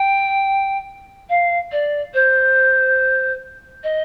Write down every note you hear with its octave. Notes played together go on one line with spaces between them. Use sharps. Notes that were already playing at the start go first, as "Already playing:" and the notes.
Already playing: G5
F5
D5
C5
D#5